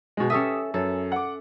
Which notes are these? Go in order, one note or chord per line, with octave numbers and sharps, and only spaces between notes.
B2 G#3
C#4 G4 A4 E5 D#6
F#2 A4
F#5 D6